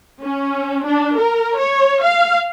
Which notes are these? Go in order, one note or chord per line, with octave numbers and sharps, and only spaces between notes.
C#4
D4
A#4
C#5
F5